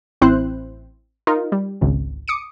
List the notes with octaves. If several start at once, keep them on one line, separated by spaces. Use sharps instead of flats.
A1 C4 E4 C5 F#6
D#4 F4 A#4
G3
G#1 C#2
D6 D#6 C#7 D7